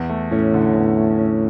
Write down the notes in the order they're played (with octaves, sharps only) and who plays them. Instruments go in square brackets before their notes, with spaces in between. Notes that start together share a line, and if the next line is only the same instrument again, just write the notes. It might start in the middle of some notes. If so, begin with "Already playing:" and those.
Already playing: [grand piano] E2
A3
[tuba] A2 [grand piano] C#4
[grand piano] D3
E2
A3
C#4